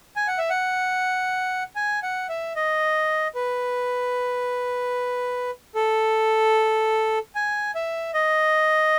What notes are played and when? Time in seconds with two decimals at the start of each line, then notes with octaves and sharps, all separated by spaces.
0.16 G#5
0.28 F#5
0.38 E5
0.50 F#5
1.76 G#5
2.03 F#5
2.29 E5
2.56 D#5
3.35 B4
5.75 A4
7.35 G#5
7.75 E5
8.14 D#5